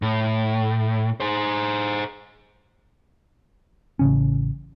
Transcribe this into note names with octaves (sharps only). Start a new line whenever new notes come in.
A2
G#4 C5
A1 C#3 C#4